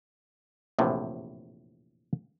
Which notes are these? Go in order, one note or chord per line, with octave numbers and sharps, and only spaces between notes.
A#1 E2 A2 C3